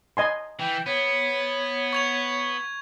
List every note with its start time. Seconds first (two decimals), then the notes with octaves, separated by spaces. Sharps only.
0.17 D#5 G#5 C6
0.59 E3 G5
0.86 B3 C#5
1.93 C#6 G#6 F7